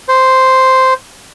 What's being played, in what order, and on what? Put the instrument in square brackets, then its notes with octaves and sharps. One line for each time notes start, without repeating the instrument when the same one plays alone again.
[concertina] C5